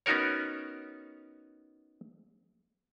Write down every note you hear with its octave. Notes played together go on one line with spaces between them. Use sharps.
B3 C#4 D#4 F#4 A#4 C#5